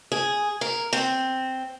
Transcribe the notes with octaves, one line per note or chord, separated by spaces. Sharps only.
G#4
A#4
C4